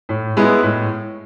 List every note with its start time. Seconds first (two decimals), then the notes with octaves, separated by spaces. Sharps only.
0.09 A2
0.37 G#3 B3 E4
0.63 A2